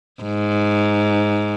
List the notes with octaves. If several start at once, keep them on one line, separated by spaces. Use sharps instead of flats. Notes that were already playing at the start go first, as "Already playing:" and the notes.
G#2